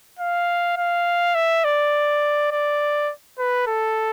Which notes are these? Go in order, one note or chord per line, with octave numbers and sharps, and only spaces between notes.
F5
F5
E5
D5
D5
B4
A4